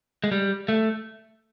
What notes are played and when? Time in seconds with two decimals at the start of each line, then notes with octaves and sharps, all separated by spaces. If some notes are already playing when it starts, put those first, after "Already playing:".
0.24 G#3
0.32 G3
0.69 A3